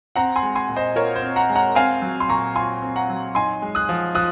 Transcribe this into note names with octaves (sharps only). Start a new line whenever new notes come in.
C4 F#5 A#5
G#5 C6
G#3
G#5 C6
A#2
C5 D#5
F4 A#4 C#5
C5
C4
F#5 A#5
G#3
F#5 A#5
C4 F5 G#5
F#3
C6
A#2 A#5 C#6
F4 G#5 C6
C4
F#5 A#5
F#3
D#4 G#5 C6
G#3
D#6 F#6
F3
F3 D#6 F#6